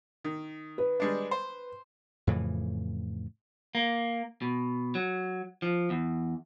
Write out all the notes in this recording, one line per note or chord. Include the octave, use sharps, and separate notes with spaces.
D#3
B4
G3 G#3 D4
C5
F2 A2 C#3 E3
A#3
B2
F#3
F3
E2